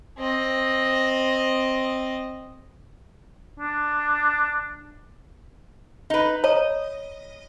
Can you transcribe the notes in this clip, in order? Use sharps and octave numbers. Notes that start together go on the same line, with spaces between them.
C4 D#5
D4
D#4 B4
C#5 D#5 A#5